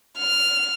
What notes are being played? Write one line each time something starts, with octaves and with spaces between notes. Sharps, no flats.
F6